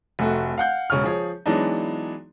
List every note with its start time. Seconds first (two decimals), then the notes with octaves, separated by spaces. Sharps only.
0.19 F1 A3 F#4
0.58 F5 F#5 G6
0.90 E1 C#3 C#6 F6
1.04 F3 G#4 C#5
1.46 E3 F#3 G#3 B3 D4 D#4